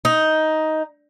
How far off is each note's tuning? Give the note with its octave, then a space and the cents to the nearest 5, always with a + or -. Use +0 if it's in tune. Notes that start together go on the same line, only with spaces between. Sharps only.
D#4 +10